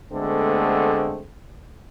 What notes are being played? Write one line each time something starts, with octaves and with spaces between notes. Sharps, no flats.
D2 D3 G#3 A3 B3 C4